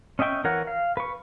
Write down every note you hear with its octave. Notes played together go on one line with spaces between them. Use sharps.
C#4 D#5 E5 G5 C#6
E3 A#4 C#5 F#5
F5
B4 C#6